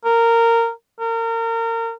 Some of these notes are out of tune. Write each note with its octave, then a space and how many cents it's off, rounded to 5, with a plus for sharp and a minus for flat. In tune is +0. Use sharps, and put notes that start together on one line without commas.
A#4 -15
A#4 -30